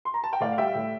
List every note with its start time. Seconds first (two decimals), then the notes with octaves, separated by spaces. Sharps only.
0.05 C6
0.14 A#5
0.24 A5
0.33 G5
0.40 A2 D5 F5
0.52 F5
0.58 G3 E5 G5
0.75 A2